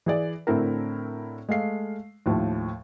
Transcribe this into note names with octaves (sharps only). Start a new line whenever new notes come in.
E3 G#4 D5
A2 D3 C4 E4 A4 A#4
G#3 A3 F5 C7
D#2 A2 F3